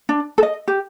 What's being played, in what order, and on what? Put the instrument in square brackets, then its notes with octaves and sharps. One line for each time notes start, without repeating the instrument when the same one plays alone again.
[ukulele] D4
A4
D#5
G4